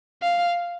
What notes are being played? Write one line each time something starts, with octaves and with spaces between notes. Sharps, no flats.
F5